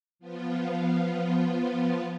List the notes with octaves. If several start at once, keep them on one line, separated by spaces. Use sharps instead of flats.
F3 B3 F4